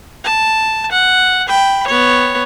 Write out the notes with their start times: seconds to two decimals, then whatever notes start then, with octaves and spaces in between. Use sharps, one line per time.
0.24 A5
0.92 F#5
1.47 G5 B5
1.87 B3 C#5